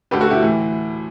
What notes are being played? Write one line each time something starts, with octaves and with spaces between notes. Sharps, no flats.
D2 D3 G4 B4
F#4 A4
E4 G4
A2 E3